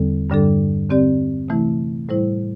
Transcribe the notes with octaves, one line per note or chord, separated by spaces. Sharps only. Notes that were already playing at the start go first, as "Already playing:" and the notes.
Already playing: E2 D3 G3 C4 A4
G2 D3 G3 D4 A4
D3 C4 G4 D5
C3 E3 A3 E4
A2 G3 E4 C5